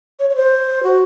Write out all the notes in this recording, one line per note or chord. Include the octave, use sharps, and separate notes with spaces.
C#5
C#5
C5
F#4